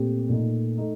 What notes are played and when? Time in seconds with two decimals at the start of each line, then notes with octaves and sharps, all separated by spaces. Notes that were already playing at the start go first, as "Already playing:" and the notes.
Already playing: A#2 A3 C4 G4
0.29 A#2 A3 D#4
0.78 A3 D#4